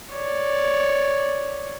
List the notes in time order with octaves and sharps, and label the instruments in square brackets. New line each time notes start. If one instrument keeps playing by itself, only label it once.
[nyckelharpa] C#5 D5